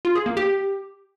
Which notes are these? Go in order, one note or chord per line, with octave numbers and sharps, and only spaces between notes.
F4
G#4
A#3
G4